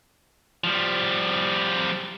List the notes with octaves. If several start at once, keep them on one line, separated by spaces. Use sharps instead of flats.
F3 G3